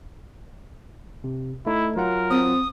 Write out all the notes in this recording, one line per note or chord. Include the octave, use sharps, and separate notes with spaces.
C3
A3 D#4 E4
F#3 F4 A#4 F#5
C4 D#6